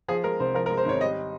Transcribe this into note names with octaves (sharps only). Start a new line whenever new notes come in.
F3 G#4
G#3 A#4
C2 C5
F3 A#4
A#4
G#3
C5
G#1 C#5
G3 D#5